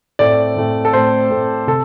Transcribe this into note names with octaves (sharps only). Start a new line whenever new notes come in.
A2 A3 C4 D5
A2 A3 C4
A4
A2 A3 C4 C5
A2 A3 C4
C3 A4